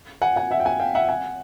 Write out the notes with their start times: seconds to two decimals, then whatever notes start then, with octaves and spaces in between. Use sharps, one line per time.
0.22 F#5 G#5
0.36 F#5 G#5
0.51 E5 F#5
0.60 G5
0.65 F#5 G#5
0.80 F5 G5
0.95 E5 F#5
1.09 F#5 G#5